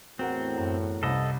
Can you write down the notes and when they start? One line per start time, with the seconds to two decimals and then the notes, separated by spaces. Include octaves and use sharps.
0.19 E2 A2 C4 F#4 A#4 F#5
0.58 F#2
1.03 C2 C3 C#4 A4 D#5